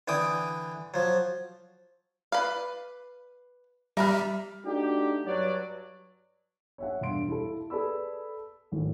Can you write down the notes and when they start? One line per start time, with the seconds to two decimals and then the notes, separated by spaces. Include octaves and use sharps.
0.08 D3 E3 G5 D#6
0.94 F3 F#3
2.32 B4 D5 F5
3.97 G3 A#4 E5 A#5 B5 F6
4.66 A3 D4 D#4 F#4 G4
5.26 G2 F#3 D5
6.78 C#5 E5 F#5
7.01 E1 G2 F5 C6 D7
7.28 E4 A4
7.70 G#4 A4 B4 D5 B5 E6
8.72 G#1 A2